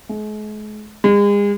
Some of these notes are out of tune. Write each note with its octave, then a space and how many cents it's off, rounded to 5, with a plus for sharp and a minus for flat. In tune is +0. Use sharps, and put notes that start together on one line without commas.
G#3 +40
G#3 -40